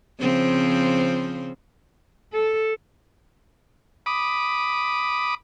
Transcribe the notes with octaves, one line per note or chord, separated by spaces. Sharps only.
C#3 F3 C4
A4
B5 D6 D#6